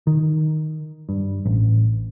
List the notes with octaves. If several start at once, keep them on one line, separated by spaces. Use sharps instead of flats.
D#3
G2
A1